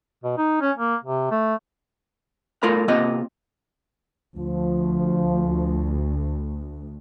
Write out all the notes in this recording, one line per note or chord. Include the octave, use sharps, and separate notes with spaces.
B2
D#4
C#4
A#3
C3
A3
A3 F4 A#4 B5
C3 A#3 F4 D#5
D2 F3